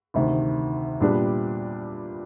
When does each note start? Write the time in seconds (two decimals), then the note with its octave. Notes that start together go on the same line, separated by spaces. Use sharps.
0.14 D2 C3 D#3
1.00 A#2 G3 B3 D4 G4